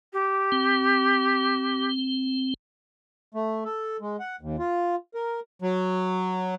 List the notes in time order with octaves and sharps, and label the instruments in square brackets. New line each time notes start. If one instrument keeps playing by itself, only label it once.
[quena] G4
[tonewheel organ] C4
[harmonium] A3
A4
G#3
F#5
D#2
F4
A#4
[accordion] F#3